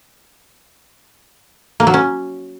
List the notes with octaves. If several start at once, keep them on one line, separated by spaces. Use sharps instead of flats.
A#3
F#3
C#4